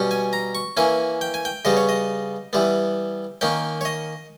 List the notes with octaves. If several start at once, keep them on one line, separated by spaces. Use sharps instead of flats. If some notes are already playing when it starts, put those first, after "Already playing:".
Already playing: B2 G3 C#4
G#5
A#5
C#6
E3 A#3 C#4 G#5
G5
G#5
G5
C#3 G3 B3 D#5
C#5
D#5
E3 G3 B3
D#3 A#3 C#4 G5
C#5
D#5